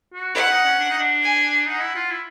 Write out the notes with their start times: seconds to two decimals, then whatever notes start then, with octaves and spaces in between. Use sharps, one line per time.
0.13 F#4
0.35 E4 F#5
0.50 D#4
0.65 C#4
0.79 D4
0.90 D#4
0.99 D4
1.23 G#5
1.66 D#4 F#5
1.81 E4
1.96 F4
2.10 E4